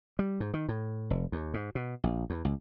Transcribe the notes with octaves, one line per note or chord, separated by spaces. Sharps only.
G3
G#2
D#3
A2
F1
D#2
G#2
B2
A#1
E2
C#2